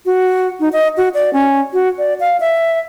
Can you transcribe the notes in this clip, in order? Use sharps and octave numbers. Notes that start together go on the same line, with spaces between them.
F#4
D#4
D#5
F#4
D5
C#4
F#4
D5
F5
E5